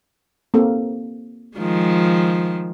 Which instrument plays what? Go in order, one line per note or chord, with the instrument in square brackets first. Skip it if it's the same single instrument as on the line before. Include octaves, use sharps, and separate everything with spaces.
[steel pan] A#3 C4 A4
[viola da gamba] D#3 F3 G#3